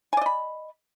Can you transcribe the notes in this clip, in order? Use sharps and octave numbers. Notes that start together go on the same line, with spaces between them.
D5 D#5 G#5 B5